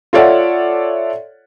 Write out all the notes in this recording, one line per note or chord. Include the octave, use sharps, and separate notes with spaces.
F4 A4 C#5 D5 E5 F#5